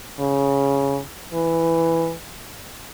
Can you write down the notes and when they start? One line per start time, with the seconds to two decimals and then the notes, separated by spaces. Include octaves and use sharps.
0.20 C#3
1.34 E3